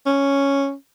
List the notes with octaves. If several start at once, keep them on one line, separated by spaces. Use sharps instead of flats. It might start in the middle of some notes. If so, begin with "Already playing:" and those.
C#4